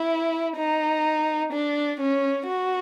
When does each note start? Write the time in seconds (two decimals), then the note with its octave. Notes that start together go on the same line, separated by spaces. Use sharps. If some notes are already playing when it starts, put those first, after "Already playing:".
Already playing: E4
0.57 D#4
1.52 D4
2.00 C#4
2.47 F#4